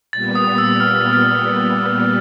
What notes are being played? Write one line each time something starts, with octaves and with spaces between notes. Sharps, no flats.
A#2 G3 B3 A6
D#6
E6
F6
F6